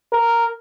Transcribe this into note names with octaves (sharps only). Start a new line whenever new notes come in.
A#4